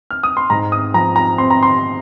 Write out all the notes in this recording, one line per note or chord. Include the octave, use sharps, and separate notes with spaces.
F6
D#6
C6
G#2 A#5
D#6
F3 A#5
A#5
C4 C6
A#5
C6